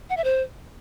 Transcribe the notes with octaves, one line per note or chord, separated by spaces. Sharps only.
F#5
E5
C5